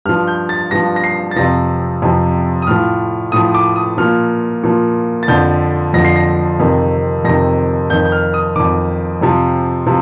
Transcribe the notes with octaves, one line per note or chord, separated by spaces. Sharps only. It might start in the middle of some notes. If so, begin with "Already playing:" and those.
G2 F3 F6
G6
A6
G2 F3 A#6
A#6
C7
A6
F2 C3 F3 A#6
F2 C3 F3
D#6
A2 F3 F6
A2 F3 D#6
D6
D#6
A#2 F3 F6
A#2 F3
A6
F2 D3 F3 G6
F2 D3 F3 A#6
C7
A#6
F2 C3 D#3
F2 C3 D#3 A#6
F2 D#3 G6
G6
F6
D#6
F2 D#3 D6
F2 C3 F3
C3 F3